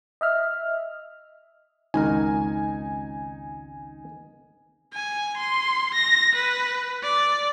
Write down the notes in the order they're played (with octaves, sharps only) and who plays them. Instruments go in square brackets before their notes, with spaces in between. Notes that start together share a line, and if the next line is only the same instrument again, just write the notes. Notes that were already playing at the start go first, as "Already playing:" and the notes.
[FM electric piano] D#5 E5 F6
[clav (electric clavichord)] G#1 C#2 A#4 [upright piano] D#4 [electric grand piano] G#5
[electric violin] G#5
C6
A#6
B4
D5